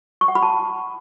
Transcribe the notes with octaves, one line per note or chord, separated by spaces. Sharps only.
C#6
F#5
B5
A5